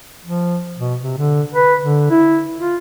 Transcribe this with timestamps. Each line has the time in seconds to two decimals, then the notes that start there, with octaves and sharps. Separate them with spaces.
0.23 F3
0.78 B2
1.03 C3
1.18 D3
1.54 B4
1.81 D3
2.10 E4
2.59 F4